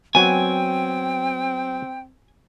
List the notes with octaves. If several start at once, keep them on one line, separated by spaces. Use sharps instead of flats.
F#3 B3 C4 G5 G#5